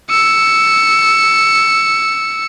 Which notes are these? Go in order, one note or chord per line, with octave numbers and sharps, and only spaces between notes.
E6 C#7